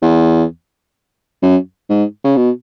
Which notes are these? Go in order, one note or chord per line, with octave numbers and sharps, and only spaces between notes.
E2
F#2
G#2
C#3
B2